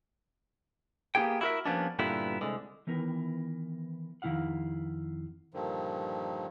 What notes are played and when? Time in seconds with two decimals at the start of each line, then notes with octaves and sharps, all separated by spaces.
1.15 A#3 B3 D4 G4 G#4 G5
1.41 E4 F#4 A4 A#4 E5
1.66 F3 G3 A#3 B3 C#4 D4
1.99 G2 A#2 D3 B3 E4 G4
2.41 C2 D3 G#3
2.87 D#3 E3 B3 A#4
4.22 F2 D#3 F3 E4 F5 F#5
5.53 G2 A#2 D3 D#3 F3